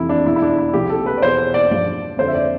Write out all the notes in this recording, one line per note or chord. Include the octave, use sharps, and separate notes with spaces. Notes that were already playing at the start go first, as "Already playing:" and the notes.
Already playing: F2 C3 E3 E4
D4
E2 B2 E4
E4
D4
E4
C2 C3 F3 G4
A4
B4
D5
E2 B2 C5
D5
G2 F3 D5
F2 D3 F3 C5
E5
D5